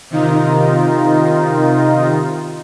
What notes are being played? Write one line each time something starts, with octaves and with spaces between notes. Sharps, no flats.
C3 D#3 D#4 F4